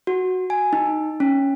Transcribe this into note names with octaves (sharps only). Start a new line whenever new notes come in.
F#4
G#5
D#4
C#4